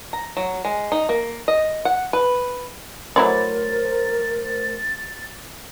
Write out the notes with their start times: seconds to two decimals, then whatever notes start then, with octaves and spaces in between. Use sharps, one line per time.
0.13 A#5
0.37 F#3
0.65 G#3
0.92 D#4
1.09 A#3
1.48 D#5
1.85 F#5
2.13 B4
3.16 F#3 A3 E4 A#4 C5 D5 A6